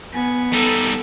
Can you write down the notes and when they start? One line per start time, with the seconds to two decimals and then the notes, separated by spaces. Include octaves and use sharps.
0.13 B3 G#5
0.53 G3 D#4 A4